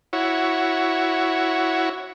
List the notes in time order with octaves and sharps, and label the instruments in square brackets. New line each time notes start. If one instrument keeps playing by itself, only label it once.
[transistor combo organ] E4 F#4 C#5